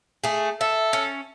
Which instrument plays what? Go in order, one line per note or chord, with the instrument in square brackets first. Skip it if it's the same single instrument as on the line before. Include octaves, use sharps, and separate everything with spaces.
[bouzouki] A3 G#4
[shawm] A4 [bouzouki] E5
[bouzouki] C#4